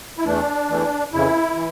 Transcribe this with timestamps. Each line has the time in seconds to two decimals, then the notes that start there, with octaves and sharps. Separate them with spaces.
0.17 E4
0.24 E2 E3 A3 D4
0.68 E2 E3 A3
1.12 F2 C#3 E3 E4
1.56 E3